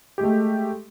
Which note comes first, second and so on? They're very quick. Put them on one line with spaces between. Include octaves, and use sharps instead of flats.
G4 G#3 A3